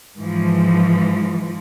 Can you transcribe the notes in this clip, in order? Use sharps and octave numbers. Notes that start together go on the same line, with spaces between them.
G#2 E3 F3